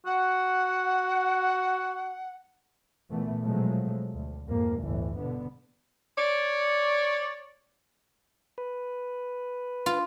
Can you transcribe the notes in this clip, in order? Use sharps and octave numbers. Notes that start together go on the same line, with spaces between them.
F#4 F#5
A#2 E3 A3 B3
B2 F3 F#3 G#3 A3
D2
F2 G#2 A#3
G1 D2 A2 E3
B2 D3 B3
C#5 D5
B4
F4